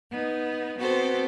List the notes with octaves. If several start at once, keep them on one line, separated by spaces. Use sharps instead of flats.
B3 D#4
B3 C4 F#4 A4 C5